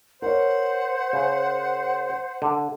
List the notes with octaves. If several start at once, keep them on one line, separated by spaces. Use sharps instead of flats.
A#4 C5 C#5 F#5
C#3
D3